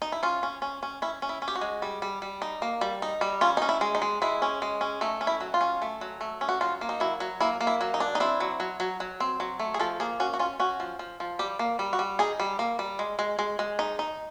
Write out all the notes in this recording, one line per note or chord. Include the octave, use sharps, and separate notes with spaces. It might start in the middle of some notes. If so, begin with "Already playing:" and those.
D#4
E4
C#4 F4
C#4
C#4
C#4
C#4 E4
C#4
E4
C#4
G4
F#4
G#3
G3
G3
G3
D#4
A#3
G3
D#4
G3
C#4 F4
C#4 D#4
E4
G#3
D#4
G#3
G#3 E4
C#4
G#3
C#4
A3 D#4
C#4
E4
F#3
F4
C#4
A3
F#3
A3
C#4
F#4
F#3 F4
A#3
D#4
F#3 E4
F#3
A#3 E4
A#3
E4
F#3
D#4
D4
D#4
C4 E4
F#3
F#3
F#3
F#3
C4
F#3
A3
G#4
F3 A4
A#3 G#4
C#4 F#4
F#4
C#4 F4
C#4 F#4
F3
F3
F3
G3 G4
A#3
G3
F#4
G3
D#4 G#4
G3
A#3
G3
G#3
G#3
G#3
G#3
D#4
D#4